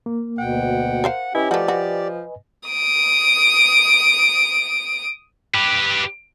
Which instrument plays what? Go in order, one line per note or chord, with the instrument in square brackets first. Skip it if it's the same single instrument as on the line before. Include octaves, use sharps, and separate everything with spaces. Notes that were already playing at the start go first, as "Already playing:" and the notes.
[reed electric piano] A#3
[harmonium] D2 B2 G5 [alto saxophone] F#5
[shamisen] A#4 C5 F5
[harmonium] C#4 G4 [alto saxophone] E4 [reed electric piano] B4 D#5 G#5
[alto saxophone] F3 [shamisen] A3 F#4 [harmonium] G4 D5
[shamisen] F#4
[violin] D#6 D7
[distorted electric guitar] G4 B4